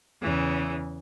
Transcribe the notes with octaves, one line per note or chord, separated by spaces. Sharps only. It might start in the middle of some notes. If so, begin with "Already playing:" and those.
E2 C#3 E3